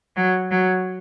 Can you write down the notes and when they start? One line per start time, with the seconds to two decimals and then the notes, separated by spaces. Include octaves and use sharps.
0.16 F#3
0.51 F#3